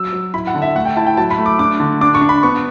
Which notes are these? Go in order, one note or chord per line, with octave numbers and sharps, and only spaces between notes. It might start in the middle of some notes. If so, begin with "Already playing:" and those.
Already playing: F#3 E6
F#3
E4 B5
F#5
D3
E5
A3 F#5
G5
E4 A5
G5
F#3 A5
B5
A3
D6
D4 D6
D3
D4 D6
C#6
D4
B5
B3 C#6